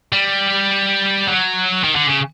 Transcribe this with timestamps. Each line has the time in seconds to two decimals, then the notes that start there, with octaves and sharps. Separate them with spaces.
0.12 G3
1.28 F#3
1.84 D#3
1.96 D3
2.07 C#3